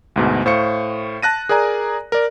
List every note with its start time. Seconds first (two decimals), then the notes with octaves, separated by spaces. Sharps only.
0.16 D2 G#2 B2
0.46 A2 C5 F5 C#6 C#7
1.22 A5 F#6 A#6 D#7
1.49 G#4 A#4 D5 G#5 A#5
2.12 A#4 D5